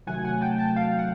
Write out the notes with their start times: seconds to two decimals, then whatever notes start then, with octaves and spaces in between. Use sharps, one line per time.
0.07 C3 D#3 F#3 A3 F#5 G#5
0.25 F#5 G#5
0.41 G5 A5
0.58 G5 A5
0.76 F5 G5
0.99 F#5